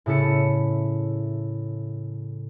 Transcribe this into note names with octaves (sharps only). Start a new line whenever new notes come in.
A2 C#3 E4 A4 C#7